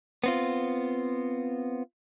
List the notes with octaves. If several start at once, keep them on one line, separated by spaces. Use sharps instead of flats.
B3 C4 F4